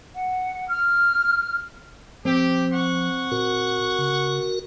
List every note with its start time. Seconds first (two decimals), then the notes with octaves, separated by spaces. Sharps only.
0.15 F#5
0.69 F6
2.25 F3 C4 G4
2.72 F#5 C#6
3.32 A#2 F#4 A#4
3.99 C#3